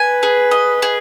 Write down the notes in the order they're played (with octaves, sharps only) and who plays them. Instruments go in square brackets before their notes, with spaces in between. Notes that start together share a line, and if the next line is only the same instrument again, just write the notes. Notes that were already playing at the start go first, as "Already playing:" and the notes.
Already playing: [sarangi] B4 [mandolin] G#5
[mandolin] G#4
D#5
G#4